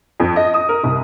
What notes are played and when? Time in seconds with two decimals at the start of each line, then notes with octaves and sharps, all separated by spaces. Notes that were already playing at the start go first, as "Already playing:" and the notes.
0.20 F2
0.36 D#5
0.54 D#6
0.69 A#4
0.83 C2